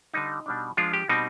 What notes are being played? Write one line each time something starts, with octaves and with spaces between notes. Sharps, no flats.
D3 G3 D4 D#4
B2 G3 D4
F3 G#3 D4 F4
G4
B2 G3 C4 D#4